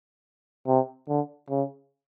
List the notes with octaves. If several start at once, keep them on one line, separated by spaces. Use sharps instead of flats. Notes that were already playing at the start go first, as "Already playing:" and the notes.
C3
D3
C#3